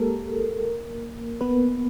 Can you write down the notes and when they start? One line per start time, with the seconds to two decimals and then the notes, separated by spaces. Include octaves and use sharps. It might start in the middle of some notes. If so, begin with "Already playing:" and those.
Already playing: G#3 A#3 G4 A4 A#4
1.41 B3 B4